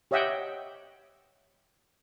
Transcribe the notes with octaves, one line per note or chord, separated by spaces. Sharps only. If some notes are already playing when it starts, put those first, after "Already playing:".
G4 C#5 D#5 E5 F#5 G5